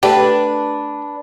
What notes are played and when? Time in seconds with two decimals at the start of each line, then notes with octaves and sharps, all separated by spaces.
0.03 A3 D4 G4 B4